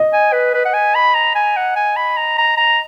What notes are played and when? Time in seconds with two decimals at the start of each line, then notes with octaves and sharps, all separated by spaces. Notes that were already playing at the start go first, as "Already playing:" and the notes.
Already playing: D#5
0.13 G#5
0.33 B4
0.54 B4
0.65 F#5
0.74 G#5
0.95 B5
1.15 A#5
1.35 G#5
1.56 F#5
1.76 G#5
1.96 B5
2.17 A#5
2.38 A#5
2.57 A#5